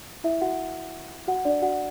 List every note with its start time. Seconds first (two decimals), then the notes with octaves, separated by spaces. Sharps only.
0.24 E4 E5
0.41 F#4 F#5
1.28 F#4 F#5
1.45 D4 D5
1.62 F#4 F#5